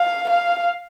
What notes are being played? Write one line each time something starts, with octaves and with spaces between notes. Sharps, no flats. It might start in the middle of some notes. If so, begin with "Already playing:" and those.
Already playing: F5
F5